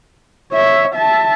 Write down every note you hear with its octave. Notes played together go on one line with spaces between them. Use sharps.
C#5 E5
E5 A5